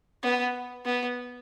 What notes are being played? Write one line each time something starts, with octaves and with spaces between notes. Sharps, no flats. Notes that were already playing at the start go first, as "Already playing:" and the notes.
B3
B3